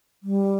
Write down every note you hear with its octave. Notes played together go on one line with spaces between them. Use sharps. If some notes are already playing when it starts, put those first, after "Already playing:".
G3